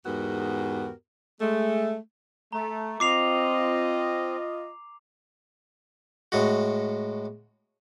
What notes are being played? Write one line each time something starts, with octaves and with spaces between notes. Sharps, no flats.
E2 G#2 B3 F#4 G4 A#4
G#3 A3
A3 A#5
C4 F4 D#5 D6 C7 F7
A2 G#3 F#4